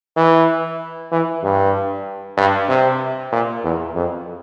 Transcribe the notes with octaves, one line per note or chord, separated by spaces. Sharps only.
E3
E3
G2
G2
C3
A#2
E2
F2